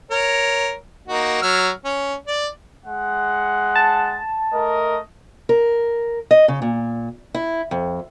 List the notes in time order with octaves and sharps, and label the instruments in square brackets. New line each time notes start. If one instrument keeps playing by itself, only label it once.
[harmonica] A#4 C#5
A#3 D#4 F#4
F#3 E6 F6
C#4
D5
[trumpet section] G#3 F#5
[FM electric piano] A5
[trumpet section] A3 A#4 D#5
[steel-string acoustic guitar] A#4
D#5
C#3
A#2
E4
F2